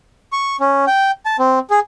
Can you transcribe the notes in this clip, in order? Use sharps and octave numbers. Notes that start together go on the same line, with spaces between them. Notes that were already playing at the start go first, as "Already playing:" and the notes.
C#6
C#4
G5
A5
C4
G#4